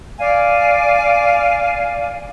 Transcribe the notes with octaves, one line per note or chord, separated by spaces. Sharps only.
D5 F5 G#5